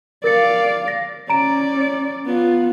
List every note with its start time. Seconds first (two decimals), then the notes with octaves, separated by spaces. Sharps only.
0.24 A#4 D5 F5 A6 C#7
0.88 A#6
1.30 C#4 D5 A#5 D7
2.26 B3 F4